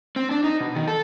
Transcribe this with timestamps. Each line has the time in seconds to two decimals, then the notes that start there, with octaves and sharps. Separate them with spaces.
0.16 C4
0.31 D4
0.44 D#4
0.60 B2
0.75 D#3
0.88 A4